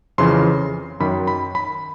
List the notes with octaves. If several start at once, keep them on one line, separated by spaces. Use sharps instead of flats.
F2 C#3 E3 C6
F#2 D#3 B5
B5
B5